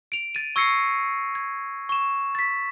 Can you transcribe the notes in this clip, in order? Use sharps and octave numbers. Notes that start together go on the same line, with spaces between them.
D7 F7
A6 D#7
C#6 E6 G#6 A#6 C7 C#7
G#6
C#6 E7
A6 B6